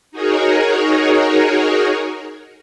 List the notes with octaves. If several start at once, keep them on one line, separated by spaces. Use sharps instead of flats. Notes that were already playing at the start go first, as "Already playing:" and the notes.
D#4 F#4 G#4 A#4 C#5